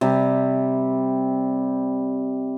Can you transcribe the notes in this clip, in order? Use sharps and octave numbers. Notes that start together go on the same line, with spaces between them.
C3 G3